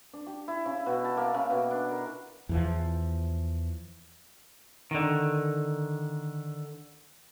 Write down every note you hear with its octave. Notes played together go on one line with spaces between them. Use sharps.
D4
G4
E4
C#3
B2
A5
A#3
C#3
B2
D4
A#4
E2 E3 F3
D3 D#3